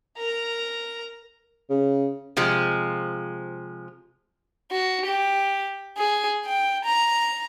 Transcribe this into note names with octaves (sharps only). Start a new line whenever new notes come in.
A#4 A#5
C#3
C3 F3 G#3
F#4
G4
G#4
G5
A#5